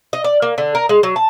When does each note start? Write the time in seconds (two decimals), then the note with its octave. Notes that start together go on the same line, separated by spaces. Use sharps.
0.13 D#5
0.24 D5
0.42 A#3
0.58 D3
0.75 A#4
0.89 G#3
1.03 F#3
1.16 A5